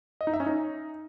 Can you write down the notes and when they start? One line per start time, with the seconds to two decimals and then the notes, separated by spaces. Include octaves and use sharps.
0.21 D#5
0.27 D#4
0.34 E5
0.40 C#4
0.46 D#4